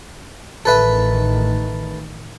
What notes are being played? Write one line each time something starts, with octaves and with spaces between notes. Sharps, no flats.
A1 D#3 A4 B4 E5